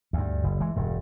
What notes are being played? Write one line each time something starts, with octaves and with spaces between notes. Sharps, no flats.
D2 G2
F#1
E3 G#3
E1 G2